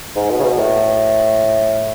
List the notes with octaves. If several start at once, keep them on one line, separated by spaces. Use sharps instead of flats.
G#2
B2
C#3
B2
A2